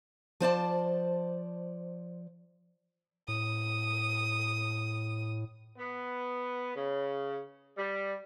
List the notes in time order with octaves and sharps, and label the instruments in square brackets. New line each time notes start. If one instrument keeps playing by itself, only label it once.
[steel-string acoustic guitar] F3 C5 D5 A5
[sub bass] A2 [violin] D#6
[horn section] B3
C#3
G3